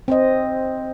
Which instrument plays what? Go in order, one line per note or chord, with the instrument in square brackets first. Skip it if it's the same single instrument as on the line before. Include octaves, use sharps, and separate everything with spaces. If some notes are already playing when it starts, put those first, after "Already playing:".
[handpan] C4 C5 D#5